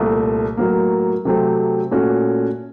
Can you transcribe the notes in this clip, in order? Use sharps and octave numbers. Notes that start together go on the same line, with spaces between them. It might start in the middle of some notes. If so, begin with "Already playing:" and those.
Already playing: C2 A#2 A3
A2 F#3 A#3
C3 F#3 A3 C4
A#2 A3 C#4 F#4